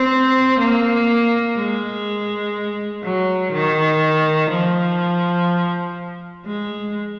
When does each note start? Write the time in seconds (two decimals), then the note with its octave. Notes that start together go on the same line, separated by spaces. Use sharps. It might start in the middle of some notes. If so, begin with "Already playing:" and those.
Already playing: C4
0.60 A#3
1.57 G#3
3.03 F#3
3.52 D#3
4.51 F3
6.46 G#3